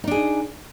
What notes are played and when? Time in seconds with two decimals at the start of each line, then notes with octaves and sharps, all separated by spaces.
0.04 D#4
0.07 D4
0.11 G#4